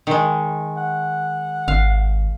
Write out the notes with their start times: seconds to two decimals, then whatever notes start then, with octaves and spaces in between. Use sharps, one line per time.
0.07 D#3 G#3
0.77 F#5
1.68 G#1 F5